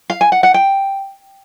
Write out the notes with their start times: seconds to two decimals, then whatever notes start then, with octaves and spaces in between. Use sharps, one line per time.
0.10 F5
0.21 G#5
0.32 F#5
0.43 F#5
0.54 G5